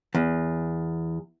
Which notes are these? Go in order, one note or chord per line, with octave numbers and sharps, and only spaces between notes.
E2